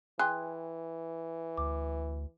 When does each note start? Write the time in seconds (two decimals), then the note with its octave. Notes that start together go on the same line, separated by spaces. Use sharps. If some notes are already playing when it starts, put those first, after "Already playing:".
0.19 E3 G#4 G5 C6 F#6
1.57 D2 D6